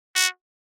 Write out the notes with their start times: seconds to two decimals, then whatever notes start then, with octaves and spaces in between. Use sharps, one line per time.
0.15 F#4